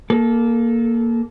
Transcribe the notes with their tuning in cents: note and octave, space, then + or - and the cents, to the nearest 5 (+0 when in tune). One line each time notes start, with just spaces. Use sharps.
A#3 +0 A4 -25